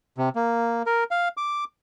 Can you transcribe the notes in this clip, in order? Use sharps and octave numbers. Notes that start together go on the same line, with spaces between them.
C3
A#3
A#4
F5
D6